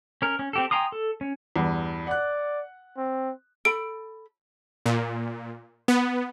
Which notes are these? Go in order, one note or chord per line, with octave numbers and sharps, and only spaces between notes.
C#4 A#4
C#4
C4 G4 A4
G5 G#5 A#5 C6 D#6
A4
C#4
E2 G2
D5 F#5 F#6
C4
A4 B5 D7
A#2
B3